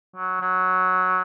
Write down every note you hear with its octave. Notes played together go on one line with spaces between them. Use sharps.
F#3
F#3